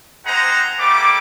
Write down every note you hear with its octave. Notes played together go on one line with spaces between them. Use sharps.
C4 D#4 G#4 C5 F#5 A#5
G3 A3 A#3 D6